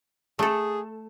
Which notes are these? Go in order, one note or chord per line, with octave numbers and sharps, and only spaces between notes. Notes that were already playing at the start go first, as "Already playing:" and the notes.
A3 G#4 A4